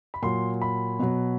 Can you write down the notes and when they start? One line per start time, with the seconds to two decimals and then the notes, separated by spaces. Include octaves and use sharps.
0.14 B5
0.22 A#2 F#3 C6
0.62 B5
0.99 B2 F#3